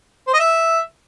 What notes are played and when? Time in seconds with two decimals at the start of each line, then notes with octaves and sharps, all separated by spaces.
0.27 C5
0.34 D#5
0.40 E5